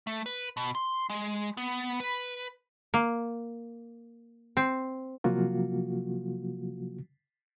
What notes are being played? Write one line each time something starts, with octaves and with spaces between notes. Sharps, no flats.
A3
B4
B2
C6
G#3
B3
B4
A#3
C4
C3 F3 F#3 A#3 F4 F#4